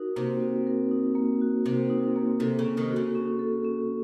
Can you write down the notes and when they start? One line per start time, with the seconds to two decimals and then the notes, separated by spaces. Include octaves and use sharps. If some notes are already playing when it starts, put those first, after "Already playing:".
Already playing: D#4 F#4 A#4
0.16 C3 A#3
0.41 F#4
0.67 A#4
0.91 D#4
1.15 A#3
1.41 F#4
1.65 C3 A#4
1.90 D#4
2.16 A#3
2.40 C3 A4
2.59 C#3
2.65 C#4
2.77 C3 D#3
2.90 F#4
2.96 C#3
3.15 C#4
3.39 A4
3.64 C#4